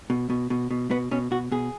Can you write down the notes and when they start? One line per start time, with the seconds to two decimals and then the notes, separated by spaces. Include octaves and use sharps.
0.10 B2
0.30 B2
0.50 B2
0.71 B2
0.91 B2 B3
1.11 B2 C#4
1.31 B2 F#4
1.52 B2 G#4